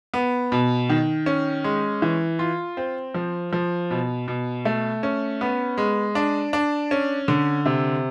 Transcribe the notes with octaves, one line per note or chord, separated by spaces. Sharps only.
B3
B2
D#3
C#4
G#3
E3
F4
C4
F3
F3
B2
B2
A3
C#4
B3
G#3
D4
D4
C#4
D3
C3